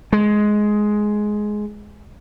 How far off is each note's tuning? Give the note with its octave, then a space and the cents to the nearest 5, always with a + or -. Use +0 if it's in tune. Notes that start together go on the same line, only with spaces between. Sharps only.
G#3 +10